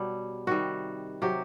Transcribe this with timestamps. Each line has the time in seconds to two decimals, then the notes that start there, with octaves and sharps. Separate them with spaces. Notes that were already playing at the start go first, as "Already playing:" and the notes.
Already playing: B2 F#3 G3
0.47 C3 D#3 G3 F#4
1.22 C3 F#3 G4